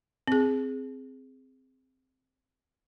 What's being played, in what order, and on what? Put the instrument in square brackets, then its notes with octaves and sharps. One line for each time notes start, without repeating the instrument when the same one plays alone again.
[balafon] C4 G#4